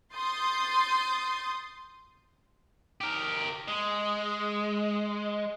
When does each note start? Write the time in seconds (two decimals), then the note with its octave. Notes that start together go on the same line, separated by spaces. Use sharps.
0.14 C6 D#6 G6 A6
3.01 G4 A#4
3.68 G#3